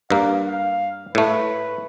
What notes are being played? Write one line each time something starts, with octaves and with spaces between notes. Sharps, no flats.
G2 A#3 F5
F5
A2 A3 B4